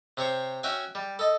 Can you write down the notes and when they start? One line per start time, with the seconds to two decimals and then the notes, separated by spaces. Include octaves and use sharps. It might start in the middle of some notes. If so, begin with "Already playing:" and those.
0.17 C3 C5 C#5 C#6
0.63 C#4 F#4 E5 G5 G#5
0.95 G3
1.19 A4 D#5